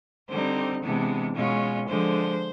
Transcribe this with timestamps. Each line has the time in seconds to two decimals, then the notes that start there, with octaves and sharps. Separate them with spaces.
0.29 D3 G3 C4 D#4 C5
0.81 C3 E3 G#3 B3 D4
1.35 B2 G#3 C#4 F4
1.88 D3 F3 G#3 C5